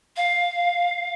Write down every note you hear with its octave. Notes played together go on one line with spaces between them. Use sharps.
F5